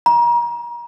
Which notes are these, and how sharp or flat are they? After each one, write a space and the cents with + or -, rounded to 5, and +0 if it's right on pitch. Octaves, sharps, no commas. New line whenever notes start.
A#5 +30